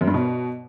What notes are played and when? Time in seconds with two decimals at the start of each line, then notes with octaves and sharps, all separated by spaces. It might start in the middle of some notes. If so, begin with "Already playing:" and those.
0.01 F#2
0.07 G2
0.14 B2